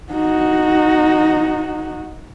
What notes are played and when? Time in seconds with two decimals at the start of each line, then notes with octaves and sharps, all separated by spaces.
0.13 D#4 F#4